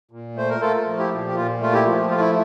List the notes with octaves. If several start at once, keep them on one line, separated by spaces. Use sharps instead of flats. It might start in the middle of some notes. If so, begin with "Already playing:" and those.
A#2
A3 C5
A#4
A3 F4 A4
F3
E4 G4
A#2
G4
A#2 F4
A3 F4
E4 G4
F3
A3 F4
E4